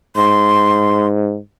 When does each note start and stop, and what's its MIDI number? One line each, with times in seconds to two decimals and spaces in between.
0.16 1.39 44
0.16 1.06 84